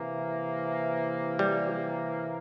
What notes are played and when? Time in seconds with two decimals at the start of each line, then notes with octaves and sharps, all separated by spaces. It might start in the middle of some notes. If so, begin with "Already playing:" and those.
Already playing: C3 E3 A#3
1.39 G3